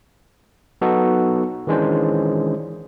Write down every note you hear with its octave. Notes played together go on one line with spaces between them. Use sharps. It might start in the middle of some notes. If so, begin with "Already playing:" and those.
F#3 B3 D#4 F#4 A4
D#3 E3 G#3 C#4 D4 C5